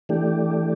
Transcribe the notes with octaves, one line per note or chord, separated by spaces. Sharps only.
E3 A3 D4 G4